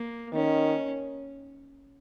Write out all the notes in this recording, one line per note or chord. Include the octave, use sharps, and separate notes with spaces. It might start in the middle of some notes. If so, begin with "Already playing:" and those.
Already playing: A#3
D#3 C#4